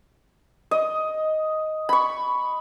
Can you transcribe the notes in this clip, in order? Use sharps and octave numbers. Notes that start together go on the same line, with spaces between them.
D#5
B5 C#6